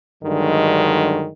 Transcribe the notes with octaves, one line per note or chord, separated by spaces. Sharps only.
G2 D3 D#3 F#3 G#3